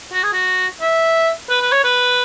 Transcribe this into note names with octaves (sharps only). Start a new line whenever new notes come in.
F#4
G#4
F#4
E5
B4
B4
C#5
B4